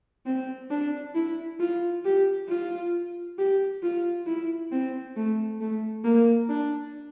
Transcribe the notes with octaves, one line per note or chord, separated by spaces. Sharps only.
C4
D4
E4
F4
G4
F4
G4
F4
E4
C4
A3
A3
A#3
D4